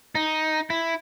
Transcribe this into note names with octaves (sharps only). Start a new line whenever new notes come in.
D#4
E4